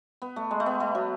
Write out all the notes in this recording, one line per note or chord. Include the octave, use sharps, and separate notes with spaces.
B3
A3
G#3
A3
B3
A3
F#3